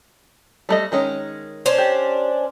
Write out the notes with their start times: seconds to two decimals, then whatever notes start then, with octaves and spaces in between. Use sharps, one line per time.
0.69 G3 A3 D#5
0.92 D#3 G#3 C#4
1.66 C#4 D4 C5
1.78 G4